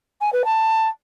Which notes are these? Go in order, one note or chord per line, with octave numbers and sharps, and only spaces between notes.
G#5
B4
A5